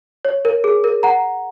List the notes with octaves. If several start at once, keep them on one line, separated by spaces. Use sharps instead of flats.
C#5
A#4
G#4
A#4
F#5 A#5